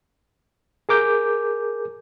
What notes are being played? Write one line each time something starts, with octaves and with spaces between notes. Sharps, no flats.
G#4 A#4 D6 G6